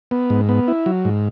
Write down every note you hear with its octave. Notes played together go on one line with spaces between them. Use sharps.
B3
G#2
B3
E4
F#3
G#2